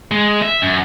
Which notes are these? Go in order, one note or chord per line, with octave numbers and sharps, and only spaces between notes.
G#3
E5
F#2